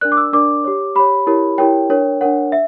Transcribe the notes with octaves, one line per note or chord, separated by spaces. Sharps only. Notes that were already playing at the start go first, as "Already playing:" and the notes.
D4 A#4 D5 F#6
D6
E6
D4 A#4 D5 D6
G4 C#5
G4 C#5 B5
E4 G4 A#4 C#5
E4 G4 A#4 C#5 G5
D4 A#4 C#5
D4 A#4 C#5 F#5
E5